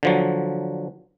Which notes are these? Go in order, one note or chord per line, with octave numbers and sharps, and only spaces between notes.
D3 F3 F#3